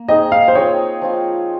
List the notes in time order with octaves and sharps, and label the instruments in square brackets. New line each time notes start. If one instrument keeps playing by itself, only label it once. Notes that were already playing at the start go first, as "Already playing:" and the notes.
Already playing: [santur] A#3
[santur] C4 D#4 G#4 [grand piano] D#5
[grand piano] F5
C5
[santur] C4 F4 G#4 D#5 [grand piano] C#5
[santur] F3 C4 F4